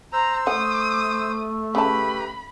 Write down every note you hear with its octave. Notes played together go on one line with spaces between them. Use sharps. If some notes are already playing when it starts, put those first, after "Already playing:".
C5 A#5 E6
A3 F#5 D#6
C#3 G4 B4 A5 B5